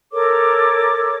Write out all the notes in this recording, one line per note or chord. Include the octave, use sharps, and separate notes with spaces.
A4 A#4 C#5 D6